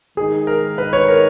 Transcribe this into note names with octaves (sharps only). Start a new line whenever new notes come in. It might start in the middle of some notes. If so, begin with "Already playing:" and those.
D#3 G#3 D#4 G#4
A#4
B4
C#5
A#4